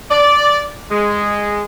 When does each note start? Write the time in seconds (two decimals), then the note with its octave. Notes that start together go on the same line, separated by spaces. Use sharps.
0.11 D5
0.91 G#3